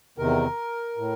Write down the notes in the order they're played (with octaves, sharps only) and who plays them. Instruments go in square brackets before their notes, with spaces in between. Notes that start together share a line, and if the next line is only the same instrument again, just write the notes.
[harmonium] E2 C3 D#3 A#4
A2